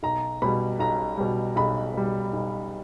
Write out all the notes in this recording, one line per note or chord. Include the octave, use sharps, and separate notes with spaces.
B1 A#5
B2 G3 B5
B1 A#5
B2 G3
B1 B5
B2 G3
B1